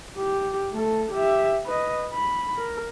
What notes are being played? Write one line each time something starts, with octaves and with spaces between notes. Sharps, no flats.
G4
A3 A4
G4 E5
B4 D#5
B5
A#4